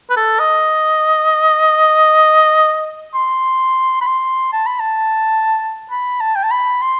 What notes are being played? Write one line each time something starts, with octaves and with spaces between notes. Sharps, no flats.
B4
A4
D#5
C6
B5
C6
A5
B5
A5
B5
A5
G5
A5
B5
C6